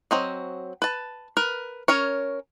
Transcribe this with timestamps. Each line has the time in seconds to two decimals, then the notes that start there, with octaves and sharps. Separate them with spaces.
0.11 F#3 C4 D#5
0.82 B4 A5
1.37 A#4 B4
1.88 C#4 A#4 C#5